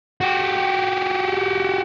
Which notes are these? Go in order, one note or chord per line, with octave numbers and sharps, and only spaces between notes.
F#4 G4